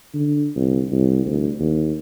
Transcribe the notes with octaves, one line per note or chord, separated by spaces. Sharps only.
D3
C2
C2
D2
D#2